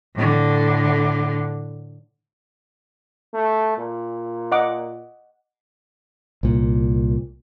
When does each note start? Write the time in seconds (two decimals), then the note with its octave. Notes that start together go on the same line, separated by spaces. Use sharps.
0.15 A2 D3
3.34 A3
3.78 A#2
4.52 D#5 F#5 D6
6.43 C2 A#2